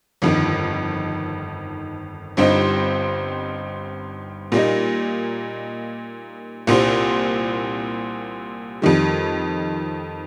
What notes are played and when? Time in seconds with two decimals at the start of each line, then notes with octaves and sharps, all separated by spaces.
0.22 G1 F2 D#3
2.37 G1 G2 G3 C4 D#4
4.52 A#2 G3 A#3 D#4
6.67 C2 A#2 G3 C4
8.82 F2 D#3 G3